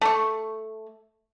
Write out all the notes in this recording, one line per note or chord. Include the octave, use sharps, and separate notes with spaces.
A3 C#6